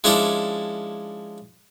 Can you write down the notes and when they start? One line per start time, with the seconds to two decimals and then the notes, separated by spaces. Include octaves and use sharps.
0.04 F3 G#3 C#4 D4 E4 D5